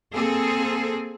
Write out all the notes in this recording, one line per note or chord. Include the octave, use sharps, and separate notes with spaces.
A#3 C4 G#4 A4